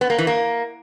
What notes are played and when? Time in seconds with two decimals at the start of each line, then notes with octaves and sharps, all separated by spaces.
0.01 B3
0.10 A#3
0.18 E3
0.27 A#3